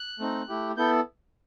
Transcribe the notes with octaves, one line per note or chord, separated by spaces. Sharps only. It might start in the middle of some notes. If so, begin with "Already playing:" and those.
Already playing: F#6
A3 C4 D#4
A3 E4 G4
B3 E4 A4 G6